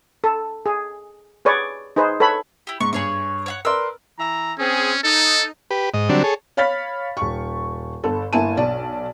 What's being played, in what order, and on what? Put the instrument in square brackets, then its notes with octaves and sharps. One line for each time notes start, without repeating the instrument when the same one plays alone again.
[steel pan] A4
G#4
G#4 B4 C#5 D5
D#4 G#4 B4 C5
A4 B4 C#5 B5
[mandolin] E4 G4
[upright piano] G#2 [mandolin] C#6
[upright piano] G2 [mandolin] G#4 C#5 C#6
[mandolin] C#5 F5 F#5
[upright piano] A#4 B4 D5 [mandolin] C6 E6
[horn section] E3 E5 A#5
[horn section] C4 G#4 [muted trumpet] C#4
[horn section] D#4 [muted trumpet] A4
[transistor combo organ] G4 B4
G#2 D#5
D3 F#3 G3 C4 D4
G#4 A4 C#5
[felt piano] C#5 F5 B5 F6 A6 B6
D#1 C#6
G1 A4
G1 A#3 E4 G#5 A5 D#7
B1 D5 A5